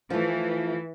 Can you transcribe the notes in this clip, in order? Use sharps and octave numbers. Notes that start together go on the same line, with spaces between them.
E3 F3 A3